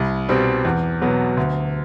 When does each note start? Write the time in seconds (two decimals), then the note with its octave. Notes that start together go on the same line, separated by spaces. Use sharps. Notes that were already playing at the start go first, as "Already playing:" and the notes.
Already playing: C2
0.29 B2 G3 C4
0.65 E2
1.01 B2 F#3 B3
1.37 D2